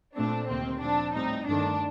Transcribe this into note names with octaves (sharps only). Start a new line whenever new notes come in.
A#2 A3 C4 D4
D2 C3 D#3 A#3 C4
A#2 F3 C4 D4
A2 G3 C4 D#4
G2 D#3 A3 D4